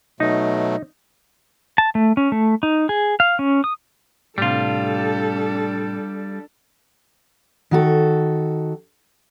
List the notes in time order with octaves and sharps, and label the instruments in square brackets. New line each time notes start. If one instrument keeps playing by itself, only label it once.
[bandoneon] B2 F#3 A3 [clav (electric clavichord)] D#4
[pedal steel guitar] A5
A3
C#4
A3
D#4
G#4
F5
C#4
D#6
[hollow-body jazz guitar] A2 C3 [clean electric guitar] G3 F4 [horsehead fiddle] D4 A4
[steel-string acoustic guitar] D#3 F#4 A4